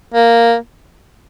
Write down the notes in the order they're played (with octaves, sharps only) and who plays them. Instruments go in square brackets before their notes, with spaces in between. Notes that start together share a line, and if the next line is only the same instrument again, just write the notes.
[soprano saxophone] A#3